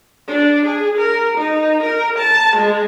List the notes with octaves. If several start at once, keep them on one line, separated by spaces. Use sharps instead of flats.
D4
G#4
A#4
D#4
A#4
A5
G#3